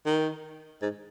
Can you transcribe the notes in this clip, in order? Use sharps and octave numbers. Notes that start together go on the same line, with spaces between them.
D#3
G#2